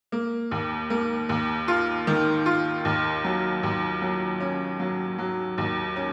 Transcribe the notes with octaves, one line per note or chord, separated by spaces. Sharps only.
A#3
D#2
A#3
D#2
F4
D#3
F4
D#2
F#3
D#2
F#3
C#4
F#3
F#3
D#2
C#4